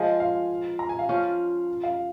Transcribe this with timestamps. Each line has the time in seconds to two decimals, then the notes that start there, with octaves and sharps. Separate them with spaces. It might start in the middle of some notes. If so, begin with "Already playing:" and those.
Already playing: F3 G#3 F4 G#5
0.20 F5
0.79 A#5
0.89 G#5
0.99 F5
1.09 F3 C#4 F4
1.83 F5